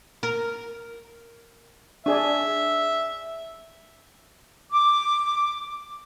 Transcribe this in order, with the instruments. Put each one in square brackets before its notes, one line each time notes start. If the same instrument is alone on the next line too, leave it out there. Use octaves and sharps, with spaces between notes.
[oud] A#4
[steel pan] D4 G#4 D5 [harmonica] E5
[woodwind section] D6